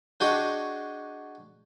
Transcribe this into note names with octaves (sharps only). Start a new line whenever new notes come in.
D4 F#4 G#4 D#5 G5 C#6